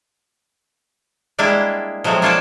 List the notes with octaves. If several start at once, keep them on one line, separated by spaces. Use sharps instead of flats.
G3 G#3 A#3 D4 E4 G#4
F3 F#3 G#3 A3 C4
A#3 D4 F4 C#5 D5 A5